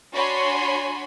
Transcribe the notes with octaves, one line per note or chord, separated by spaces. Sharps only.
D4 F#4 C#5 G#5 B5 C6